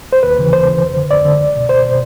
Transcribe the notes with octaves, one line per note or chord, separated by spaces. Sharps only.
C5
D#2 B4
C#3 E3
D#2 C5
C#3 E3
F2
D3
F2 D5
D3
C#2
B2
C#2 C5
B2